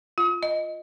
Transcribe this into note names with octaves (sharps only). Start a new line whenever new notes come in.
F4
D#5